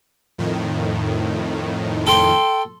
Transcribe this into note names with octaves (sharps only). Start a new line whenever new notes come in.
F2 A2 D#3
A4 G5 C6